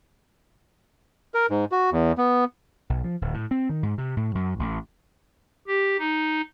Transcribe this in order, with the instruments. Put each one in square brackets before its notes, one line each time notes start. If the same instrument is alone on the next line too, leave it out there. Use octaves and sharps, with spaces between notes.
[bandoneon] A#4
G#2
F#4
E2
B3
[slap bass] B1
F3
D1
A2
C4
D#3
G#2
C3
A2
F#2
A1
[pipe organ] G4
D#4